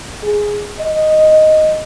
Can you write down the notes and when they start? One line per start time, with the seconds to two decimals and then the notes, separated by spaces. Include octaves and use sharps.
0.23 G#4
0.80 D#5